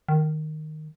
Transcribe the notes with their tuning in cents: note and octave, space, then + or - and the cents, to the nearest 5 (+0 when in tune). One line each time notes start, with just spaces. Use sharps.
D#3 -10